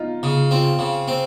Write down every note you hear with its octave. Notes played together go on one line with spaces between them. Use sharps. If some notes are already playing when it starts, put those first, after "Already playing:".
Already playing: D#4 F4
C#3
C4 F4
C#3
C4